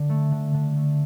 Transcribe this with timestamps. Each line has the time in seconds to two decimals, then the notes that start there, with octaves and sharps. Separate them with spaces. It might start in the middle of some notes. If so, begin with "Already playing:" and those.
Already playing: D3
0.09 A3
0.32 D3
0.54 D3
0.76 A3